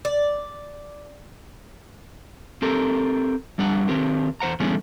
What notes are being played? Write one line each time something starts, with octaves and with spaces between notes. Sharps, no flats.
D5
C4 G4 A4 A#4
F2 G3 D4 F#5
D#3 C4 G4 A#4
E2 C5 F#5 A#5
D3 E3 G3 B3 C#4 G#4